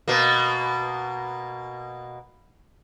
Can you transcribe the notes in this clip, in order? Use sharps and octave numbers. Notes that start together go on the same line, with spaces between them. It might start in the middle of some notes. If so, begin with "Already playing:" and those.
B2 A#3